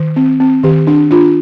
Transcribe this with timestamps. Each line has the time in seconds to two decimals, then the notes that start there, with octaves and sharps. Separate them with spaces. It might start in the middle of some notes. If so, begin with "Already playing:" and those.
Already playing: D#3
0.16 C4
0.40 C4
0.63 D#3 G4
0.87 D4
1.11 D4 F4